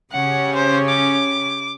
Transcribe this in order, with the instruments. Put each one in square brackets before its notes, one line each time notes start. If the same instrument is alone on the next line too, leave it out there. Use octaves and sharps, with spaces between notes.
[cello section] C#3 C#4 G4 [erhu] F#5
[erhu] C5
D6